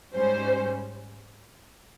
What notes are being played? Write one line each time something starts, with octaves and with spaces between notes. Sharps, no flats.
G#2 G3 C#4 C5